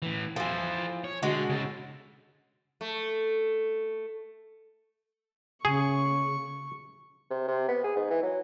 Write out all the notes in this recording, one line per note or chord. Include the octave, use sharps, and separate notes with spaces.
A2 E3
E3 F3 A4 C5
C#5
D3 G#3 F#4
C#3 A4
A3
C#3 G#4 C#6
C3
C3
B3
G#4
G#2
E3
F#3